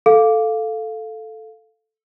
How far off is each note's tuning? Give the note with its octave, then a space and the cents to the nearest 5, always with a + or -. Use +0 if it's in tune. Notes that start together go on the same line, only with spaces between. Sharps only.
A4 +0 F5 +0